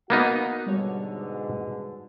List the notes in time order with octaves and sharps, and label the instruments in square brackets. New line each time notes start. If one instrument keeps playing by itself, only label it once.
[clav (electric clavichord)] A#3 B3 D#4 [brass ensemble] F#4 F#5
[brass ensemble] G#2 B2 D3 [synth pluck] G3 C#5